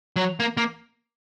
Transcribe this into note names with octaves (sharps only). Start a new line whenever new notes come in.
F#3
A#3
A#3